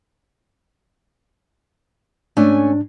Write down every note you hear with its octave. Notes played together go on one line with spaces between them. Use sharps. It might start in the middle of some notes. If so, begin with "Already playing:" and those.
G#2 A3 C#4 D4 G#5